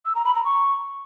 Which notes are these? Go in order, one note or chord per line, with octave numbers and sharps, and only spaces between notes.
E6
A#5
B5
A#5
C#6